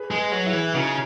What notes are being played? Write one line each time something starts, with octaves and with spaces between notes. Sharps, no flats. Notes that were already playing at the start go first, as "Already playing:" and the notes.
Already playing: G#4 B4
G#3
G#4 B4
F#3
E4 G#4
E3
C#3 D#4 F#4